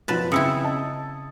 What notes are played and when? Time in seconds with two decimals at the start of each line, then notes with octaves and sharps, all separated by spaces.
0.08 F#2 B2 F3 B4 A5
0.32 C#3 C4 E4 D#6 E6 C#7
0.63 D#5 A5